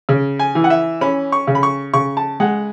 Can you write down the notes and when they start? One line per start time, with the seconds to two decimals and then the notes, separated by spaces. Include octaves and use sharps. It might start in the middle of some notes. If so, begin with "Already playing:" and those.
0.09 C#3
0.39 G#5
0.55 E3
0.64 F#5
0.70 E5
1.01 C#4 B5
1.32 C#6
1.47 C#3
1.55 B5
1.63 C#6
1.94 C#3 C#6
2.17 A5
2.40 G#3 F#5